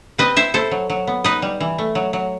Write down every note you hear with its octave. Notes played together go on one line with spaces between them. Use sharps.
C4 B4 D#5
E4 C5 E5
E4 A4 C5
F#3
F#3
B3
D#4 B4 D#5
G3
E3
A3
F#3
F#3